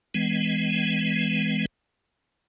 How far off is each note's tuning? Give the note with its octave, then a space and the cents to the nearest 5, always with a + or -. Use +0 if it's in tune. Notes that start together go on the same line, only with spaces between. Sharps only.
E3 +0 G#3 +0 B3 +40